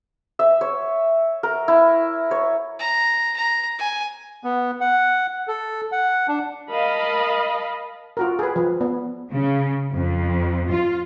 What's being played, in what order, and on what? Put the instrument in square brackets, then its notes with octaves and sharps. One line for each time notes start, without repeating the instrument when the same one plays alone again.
[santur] E5
C#5
A#4
E4
C#5
[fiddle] A#5
A#5
G#5
[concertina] B3
F#5
A4
F#5
D4
[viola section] A#4 D#5 F5 A5 B5
[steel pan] F4 F#4 A#4
G#4 B4
F3
B3
[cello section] C#3
F2
F4